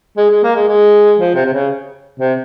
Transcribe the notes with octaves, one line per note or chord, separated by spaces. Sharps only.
G#3
G#3
A#3
G#3
G#3
F3
C3
C3
C#3
C3